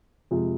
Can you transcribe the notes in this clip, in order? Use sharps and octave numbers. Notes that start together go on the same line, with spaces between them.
F2 C3 F3 G#3